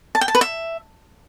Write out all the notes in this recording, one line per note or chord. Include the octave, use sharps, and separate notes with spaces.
A5
G5
A5
B4
E5